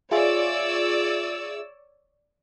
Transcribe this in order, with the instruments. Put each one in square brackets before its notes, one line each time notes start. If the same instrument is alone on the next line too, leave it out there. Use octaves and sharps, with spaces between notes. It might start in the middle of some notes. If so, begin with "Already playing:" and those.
[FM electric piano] F4 G#4 E5 [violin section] C#5 D5 E6